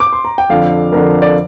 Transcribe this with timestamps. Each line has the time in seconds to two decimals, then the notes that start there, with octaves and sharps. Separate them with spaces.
0.00 D6
0.13 C6
0.25 A#5
0.38 G5
0.50 F2 D3 F5
0.92 F2 D3 A#4
1.22 D5